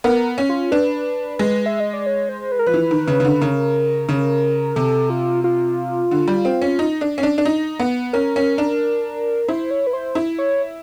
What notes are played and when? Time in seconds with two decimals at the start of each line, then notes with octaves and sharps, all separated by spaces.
0.04 B3 A#4
0.38 C#4
0.49 F4
0.72 D4 B4
1.39 G#3
1.66 E5
1.80 D#5
1.93 D5
2.06 C#5
2.29 C5
2.52 B4
2.59 A#4
2.66 F3 B4
2.74 E3
2.91 D#3
3.08 C#3
3.20 C#3
3.25 D3
3.42 C#3 A#4
4.09 C#3
4.76 C3 A4
5.10 F4
5.44 F4
6.11 D3
6.28 G3
6.45 C4
6.62 C#4
6.79 D#4
7.01 D4
7.18 C#4
7.23 D4
7.38 D4
7.45 D#4
7.79 B3
8.13 C#4 A#4
8.36 C#4
8.58 D4
9.48 E4 C5
9.71 C#5
9.87 B4
9.93 C5
10.15 E4
10.38 C#5